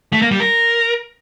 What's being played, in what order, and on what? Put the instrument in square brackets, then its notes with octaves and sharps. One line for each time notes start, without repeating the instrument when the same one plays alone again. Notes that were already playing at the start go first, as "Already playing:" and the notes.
[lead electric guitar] A3
A#3
G3
A#4